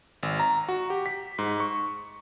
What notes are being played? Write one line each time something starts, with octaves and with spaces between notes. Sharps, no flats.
G#1
A#5
F#4
G4
B6
G#2
C#6